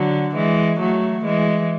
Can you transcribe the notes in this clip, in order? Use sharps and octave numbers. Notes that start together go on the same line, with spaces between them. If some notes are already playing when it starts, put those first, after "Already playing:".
Already playing: D3 F#3
E3 G#3
F#3 A3
E3 G#3